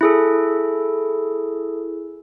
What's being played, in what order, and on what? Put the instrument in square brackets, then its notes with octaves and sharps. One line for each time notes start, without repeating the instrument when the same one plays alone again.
[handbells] E4 G#4 A4